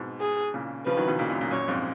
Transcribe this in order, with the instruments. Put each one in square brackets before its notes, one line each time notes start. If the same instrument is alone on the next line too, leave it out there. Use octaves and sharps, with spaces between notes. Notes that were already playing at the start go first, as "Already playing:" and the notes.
Already playing: [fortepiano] G#2 B2
[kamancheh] G#4
[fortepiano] A#2 C#3
[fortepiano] C#3 F3 [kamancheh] B4
[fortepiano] D#3 F#3
B2 D#3
A#2 C#3
F#2 A#2
F#2 A#2
[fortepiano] F#2 A#2 [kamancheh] C#5
[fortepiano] F2 G#2